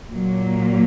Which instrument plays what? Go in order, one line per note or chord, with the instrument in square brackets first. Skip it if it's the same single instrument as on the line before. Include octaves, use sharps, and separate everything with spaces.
[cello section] A#2 F#3 A#3